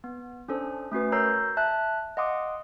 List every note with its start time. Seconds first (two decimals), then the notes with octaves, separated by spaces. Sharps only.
0.04 B3
0.48 C#4 D4 A4 C5
0.92 A3 C#4 F#4 B4
1.12 A#4 C#5 A#5 E6 G6 C7
1.57 E5 A5 F#6
2.17 D#5 F5 F#5 C6 D6 D#6